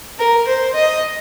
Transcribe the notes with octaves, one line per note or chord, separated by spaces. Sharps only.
A#4
C5
D#5